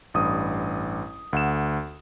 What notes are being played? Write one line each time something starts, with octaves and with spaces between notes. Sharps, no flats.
A1 G2 D#6
D2 F#5 E7